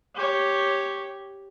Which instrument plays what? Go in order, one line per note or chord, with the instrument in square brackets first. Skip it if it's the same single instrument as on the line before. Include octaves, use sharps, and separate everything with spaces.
[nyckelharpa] G4 C#5